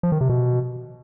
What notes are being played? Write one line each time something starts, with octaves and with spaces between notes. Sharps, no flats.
F3
D#3
C3
B2